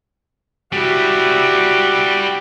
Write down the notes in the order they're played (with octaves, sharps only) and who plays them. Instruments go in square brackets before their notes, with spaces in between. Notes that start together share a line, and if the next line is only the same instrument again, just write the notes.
[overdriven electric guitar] G3 E4 [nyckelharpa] F#4 G4